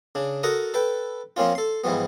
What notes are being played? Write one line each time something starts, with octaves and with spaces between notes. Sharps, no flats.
C#3 D4
F#4 A4 A#4 F#5 A#5 D#6
A4 B4 G5
F3 A#3 C4 C#4 F4
A4 C6
G#2 E3 F3 G3 B3